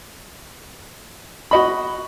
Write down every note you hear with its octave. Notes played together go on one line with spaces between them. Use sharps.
F#4 D#5 B5